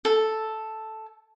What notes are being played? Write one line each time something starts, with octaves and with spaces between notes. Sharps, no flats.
A4